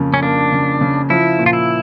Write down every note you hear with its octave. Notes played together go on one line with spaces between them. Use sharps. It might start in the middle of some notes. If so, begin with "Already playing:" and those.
Already playing: F2 C#3 A#3
C#4
A#3 D4
C#3
C#3
F3 E4
A#2
F4
E4